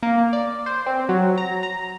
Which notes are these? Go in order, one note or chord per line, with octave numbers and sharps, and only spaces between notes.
A#3
D5
C5
C4
F#3
A#5
A#5